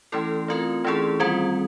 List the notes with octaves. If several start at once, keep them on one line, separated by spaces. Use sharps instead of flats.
E3 A3 C#4 E4 A4
A3 C4 F4 A#4
E3 A3 C#4 E4 G#4
D#3 G3 C4 F4